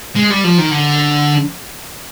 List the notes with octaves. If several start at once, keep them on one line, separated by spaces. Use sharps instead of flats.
G#3
G3
F3
D#3
D3